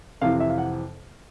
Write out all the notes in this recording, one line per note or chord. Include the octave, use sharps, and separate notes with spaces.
F2 C3 E3 F5
E5
F5
F#5